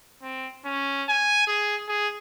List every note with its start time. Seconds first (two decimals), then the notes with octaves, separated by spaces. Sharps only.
0.22 C4
0.65 C#4
1.09 G#5
1.48 G#4
1.89 G#4